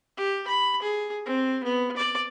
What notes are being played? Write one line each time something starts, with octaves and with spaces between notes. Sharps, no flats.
G4
B5
G#4
C4
B3
D5